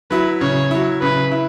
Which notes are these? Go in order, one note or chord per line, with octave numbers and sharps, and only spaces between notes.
F#3 E4 B4
C#3 C#5
F#3 E4
C#3 B4
E4